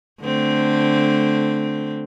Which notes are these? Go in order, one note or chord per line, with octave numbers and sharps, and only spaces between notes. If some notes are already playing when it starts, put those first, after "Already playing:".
D3 A3 C4